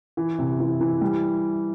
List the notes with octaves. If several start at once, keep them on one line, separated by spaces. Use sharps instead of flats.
E3
C3
E3
E3
G3